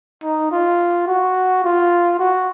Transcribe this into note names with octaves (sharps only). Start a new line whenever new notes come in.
D#4
F4
F#4
F4
F#4